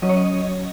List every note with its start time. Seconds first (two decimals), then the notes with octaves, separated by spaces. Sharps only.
0.02 F#3 C#4 D#5
0.09 C#5
0.17 D#5